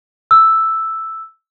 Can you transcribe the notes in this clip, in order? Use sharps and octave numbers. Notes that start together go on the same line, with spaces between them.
E6